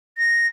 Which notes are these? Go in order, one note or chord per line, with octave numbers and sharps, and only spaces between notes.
A#6